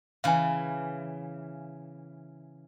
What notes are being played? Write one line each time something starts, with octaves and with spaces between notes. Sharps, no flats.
C#3 E3 F5 G#5